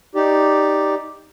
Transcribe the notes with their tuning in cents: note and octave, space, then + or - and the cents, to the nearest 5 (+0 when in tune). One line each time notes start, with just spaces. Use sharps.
D#4 +0 G4 +0 D5 +0